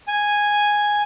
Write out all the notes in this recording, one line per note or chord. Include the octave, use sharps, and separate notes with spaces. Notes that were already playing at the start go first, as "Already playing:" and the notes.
G#5